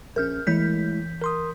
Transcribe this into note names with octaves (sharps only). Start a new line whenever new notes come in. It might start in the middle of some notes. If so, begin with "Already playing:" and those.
A#1 C#4 A#4 F6 G6
E3 G#3 A3 E4 G6 B6
A#4 C6 D#6